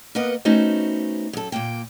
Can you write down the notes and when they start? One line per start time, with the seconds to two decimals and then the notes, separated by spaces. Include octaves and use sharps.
0.15 A#3 B3 A#4 B4 D#5 F#5
0.45 A3 B3 C#4 D#4 F#4 C5
1.33 F#2 A4
1.52 A#2 F3 A#3 G5